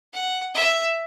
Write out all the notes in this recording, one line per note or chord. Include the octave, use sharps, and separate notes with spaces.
F#5
E5